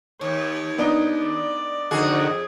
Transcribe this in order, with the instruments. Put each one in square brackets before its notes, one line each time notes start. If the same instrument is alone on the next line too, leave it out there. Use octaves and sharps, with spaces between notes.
[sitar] D#2 [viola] C#5
[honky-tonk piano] B3 D4 D#4
[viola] D5
[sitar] F2 G#4 [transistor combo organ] D3 D#3 F#4